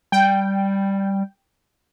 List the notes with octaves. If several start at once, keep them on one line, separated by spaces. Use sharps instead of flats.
G3 G5